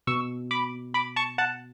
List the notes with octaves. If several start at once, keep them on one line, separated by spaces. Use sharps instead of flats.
B2 C#6 E6
B5 D6
B5 D6
A5 C#6
F#5 A5